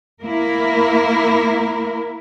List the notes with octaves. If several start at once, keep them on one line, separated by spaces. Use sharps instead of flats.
A#3 E4 A#4